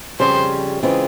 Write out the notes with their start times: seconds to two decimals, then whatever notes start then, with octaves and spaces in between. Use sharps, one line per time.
0.19 F2 C#3 G3 C#4 C5
0.83 C#3 E3 G#3 C4 F4